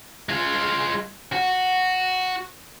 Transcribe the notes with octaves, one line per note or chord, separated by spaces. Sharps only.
G#3 F4
F#4